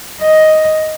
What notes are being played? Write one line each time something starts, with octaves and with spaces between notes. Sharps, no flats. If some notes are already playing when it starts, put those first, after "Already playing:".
D#5